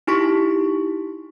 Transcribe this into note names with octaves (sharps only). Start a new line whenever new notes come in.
D#4 E4 G4 C#6 B6